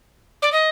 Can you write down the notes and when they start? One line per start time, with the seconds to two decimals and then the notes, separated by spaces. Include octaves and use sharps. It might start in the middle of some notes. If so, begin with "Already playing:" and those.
0.42 D5
0.52 D#5